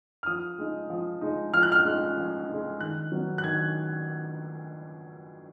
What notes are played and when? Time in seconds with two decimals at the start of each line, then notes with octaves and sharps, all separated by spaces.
0.23 F6
0.26 F3 D#6
0.58 G#3 D#4
0.90 F3
1.21 G#3 D#4
1.54 F3 F6
1.63 F#6
1.72 F6
1.85 G#3 D#4
2.17 F3
2.49 G#3 D#4
2.81 D#3 F#6
3.12 F#3 B3
3.38 F#6
3.44 D#3 G#6